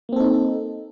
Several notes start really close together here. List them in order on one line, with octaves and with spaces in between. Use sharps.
A#3 C4 A4 D#4